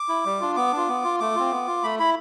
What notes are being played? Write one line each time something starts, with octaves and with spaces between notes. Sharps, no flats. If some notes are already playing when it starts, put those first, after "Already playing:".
Already playing: D6
E4
G3
D4 F4
B3 D6
D4 F4
B3
F4
A3 D6
C4 F4
B3
F4
A3 B5
E4 B5